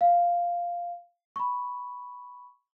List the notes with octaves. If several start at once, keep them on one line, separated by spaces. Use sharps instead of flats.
F5
B5 C#6